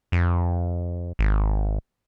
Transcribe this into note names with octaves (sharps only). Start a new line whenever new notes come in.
F2
G#1